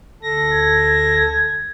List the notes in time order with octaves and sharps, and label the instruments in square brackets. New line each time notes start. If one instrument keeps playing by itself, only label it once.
[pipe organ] D2 A4 A#6
[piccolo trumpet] G#6